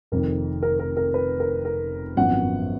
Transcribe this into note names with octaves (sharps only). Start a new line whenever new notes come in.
F1 F2 D#3 A#4
A#4
A#4
A#4
B4
A#4
A#4
G#1 F#2 F3 B3 F#5